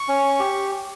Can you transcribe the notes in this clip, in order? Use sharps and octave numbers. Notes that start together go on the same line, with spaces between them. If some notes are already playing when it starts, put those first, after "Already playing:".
Already playing: C#6
C#4
G4